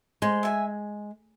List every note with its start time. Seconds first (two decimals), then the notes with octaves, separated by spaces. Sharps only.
0.22 G#3 C5
0.43 E5 G#5